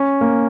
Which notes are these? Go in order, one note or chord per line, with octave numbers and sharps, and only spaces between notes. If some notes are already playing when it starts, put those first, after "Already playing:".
Already playing: C#4
A#3